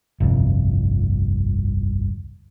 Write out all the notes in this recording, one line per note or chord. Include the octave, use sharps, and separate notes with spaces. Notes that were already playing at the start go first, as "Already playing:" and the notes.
G1 C2 F2